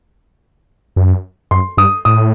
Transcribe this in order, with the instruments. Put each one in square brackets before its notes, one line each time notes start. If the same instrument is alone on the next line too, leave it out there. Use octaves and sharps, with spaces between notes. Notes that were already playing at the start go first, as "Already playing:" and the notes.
[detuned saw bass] F#2
[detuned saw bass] F#2 [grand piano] C6
[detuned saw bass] G2 [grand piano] D#6
[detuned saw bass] A2 [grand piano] D#6